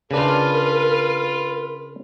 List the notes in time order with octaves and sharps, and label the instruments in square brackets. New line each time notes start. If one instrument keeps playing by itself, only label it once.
[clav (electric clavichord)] C#3 D4 [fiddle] F4 B4 [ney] A#4